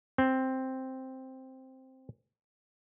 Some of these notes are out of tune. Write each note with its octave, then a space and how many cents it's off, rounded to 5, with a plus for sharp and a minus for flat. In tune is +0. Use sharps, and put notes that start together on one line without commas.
C4 +0